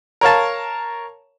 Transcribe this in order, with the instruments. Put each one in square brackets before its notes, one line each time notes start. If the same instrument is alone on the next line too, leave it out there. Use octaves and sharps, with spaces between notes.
[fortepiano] A#4 C#5 F5 A5